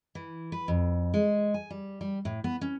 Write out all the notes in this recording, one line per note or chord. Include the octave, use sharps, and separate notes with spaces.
E3
B4
F2
G#3
G#5
G3
G3
A2
B3
C#4